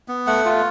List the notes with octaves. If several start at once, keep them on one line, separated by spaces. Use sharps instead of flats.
B3
A3 F#5
F4